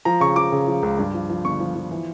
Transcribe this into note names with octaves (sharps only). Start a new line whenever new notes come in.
F3 A#5
C#3 C#6
F3 D6
C#3
F3
C#2
G2
F3
F3
G1 C#6
F3
F3
E3